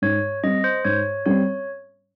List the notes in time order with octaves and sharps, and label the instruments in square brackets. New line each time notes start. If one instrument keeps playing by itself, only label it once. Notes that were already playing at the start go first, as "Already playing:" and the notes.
[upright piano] G#2 [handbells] C#5
[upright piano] G3 C4 [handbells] D#5
[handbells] C5
[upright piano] G#2 [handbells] C#5
[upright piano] G3 C4 [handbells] C#5